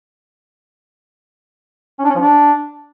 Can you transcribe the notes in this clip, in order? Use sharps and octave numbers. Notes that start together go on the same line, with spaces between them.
C#4
D4
C#4
F3
D4